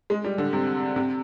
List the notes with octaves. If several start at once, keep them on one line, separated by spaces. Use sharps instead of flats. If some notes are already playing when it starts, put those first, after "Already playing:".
G#3
G3
D3
C3
C3